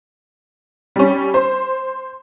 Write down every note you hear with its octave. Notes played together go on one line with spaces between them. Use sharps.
G3 C#4
C5